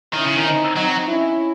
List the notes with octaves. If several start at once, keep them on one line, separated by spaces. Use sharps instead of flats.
D#3 C#4 E4
C#3
D#3
C4 D#4
F#3 C4 D#4
C#4 E4